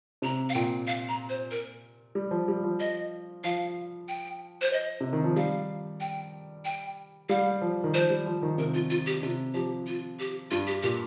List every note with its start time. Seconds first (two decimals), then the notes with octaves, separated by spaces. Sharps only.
0.22 C3 A#5
0.50 F5
0.54 A#2 G5
0.87 F5
1.09 A#5
1.29 C5
1.51 A#4
2.15 G3
2.31 F3
2.48 G3
2.64 F3
2.80 D#5
3.44 F3 F5
4.08 G5
4.62 C5
4.73 D#5
5.00 C3
5.13 D#3
5.24 F3
5.36 G3 F5
6.00 G5
6.65 G5
7.29 G3 F5
7.61 F3
7.84 D#3
7.94 F3 C5
8.10 G3
8.26 F3
8.42 D#3
8.58 C3 A#4
8.74 F4
8.90 F4
9.06 G4
9.23 C3 F4
9.54 F3 G4
9.87 F4
10.19 G4
10.51 G2 F4
10.67 G4
10.83 A#2 G4